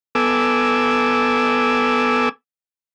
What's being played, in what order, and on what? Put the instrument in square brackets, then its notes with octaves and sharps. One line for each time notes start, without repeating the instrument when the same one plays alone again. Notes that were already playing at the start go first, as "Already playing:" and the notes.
[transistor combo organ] B3 A4 G#5 D6 E6